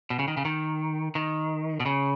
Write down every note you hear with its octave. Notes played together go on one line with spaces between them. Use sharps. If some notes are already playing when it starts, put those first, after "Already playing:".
B2
C#3
D#3
C#3
D#3
D#3
B2
C#3